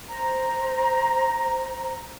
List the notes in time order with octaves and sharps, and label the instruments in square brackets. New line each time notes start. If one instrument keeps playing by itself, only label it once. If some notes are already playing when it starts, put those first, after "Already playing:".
[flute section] C5 A#5